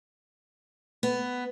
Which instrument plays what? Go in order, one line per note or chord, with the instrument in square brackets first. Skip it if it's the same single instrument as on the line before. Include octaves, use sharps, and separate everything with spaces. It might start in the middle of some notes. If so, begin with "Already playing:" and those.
[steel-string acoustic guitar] B3